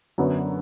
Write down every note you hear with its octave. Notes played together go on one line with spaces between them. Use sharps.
F#2 D3 F#3 B3